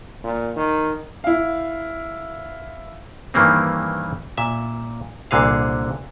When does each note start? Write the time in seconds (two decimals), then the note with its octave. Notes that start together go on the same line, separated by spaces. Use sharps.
0.24 A#2
0.56 D#3
1.24 E4 F5
3.34 G2 D#3 E3 G3 A#3 C4
4.37 A#2 E5
5.31 C2 A#2 D3 G#4 F5